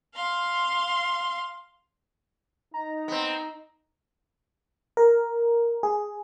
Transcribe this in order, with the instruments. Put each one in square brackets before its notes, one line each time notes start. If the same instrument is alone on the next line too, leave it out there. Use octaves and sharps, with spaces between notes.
[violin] F5 C6
[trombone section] D#4 [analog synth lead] A#5
[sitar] B3 C4
[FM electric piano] A#4
G#4